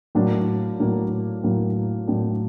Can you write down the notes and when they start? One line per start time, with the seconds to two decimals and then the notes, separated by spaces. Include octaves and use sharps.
0.15 A2 F#3 A#3 D4
0.80 A2 F#3 A#3 D4
1.43 A2 F#3 A#3 D4
2.07 A2 F#3 A#3 D4